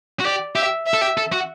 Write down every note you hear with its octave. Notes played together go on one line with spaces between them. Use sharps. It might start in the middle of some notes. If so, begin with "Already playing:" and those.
F#4
G4 D5
G4 E5
E5
A4
G4
A4
F#4